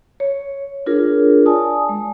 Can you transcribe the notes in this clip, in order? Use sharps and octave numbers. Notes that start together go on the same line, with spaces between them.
C#5
D4 F4 G#4 A#4 C#5
D5 G#5 A5 D#6
G#3